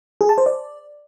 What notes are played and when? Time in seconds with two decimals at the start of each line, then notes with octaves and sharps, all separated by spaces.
0.21 G#4
0.29 A5
0.38 C5
0.46 D5